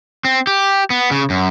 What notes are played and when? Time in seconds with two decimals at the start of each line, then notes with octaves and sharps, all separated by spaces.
0.25 C4
0.47 G4
0.90 B3
1.11 C#3
1.30 F#2